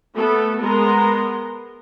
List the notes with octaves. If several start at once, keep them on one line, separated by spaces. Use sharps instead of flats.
A3 B3 A4
G#3 B3 A#4 A#5 C6